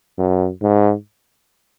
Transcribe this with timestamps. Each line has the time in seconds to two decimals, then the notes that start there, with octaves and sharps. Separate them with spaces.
0.18 F#2
0.62 G#2